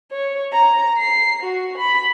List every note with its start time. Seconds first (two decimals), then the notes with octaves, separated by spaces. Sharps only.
0.11 C#5
0.53 A#5
0.98 C7
1.42 F#4
1.78 B5